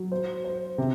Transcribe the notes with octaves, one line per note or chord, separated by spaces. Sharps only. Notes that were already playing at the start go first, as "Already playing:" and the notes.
Already playing: F#3
C5
C5
C3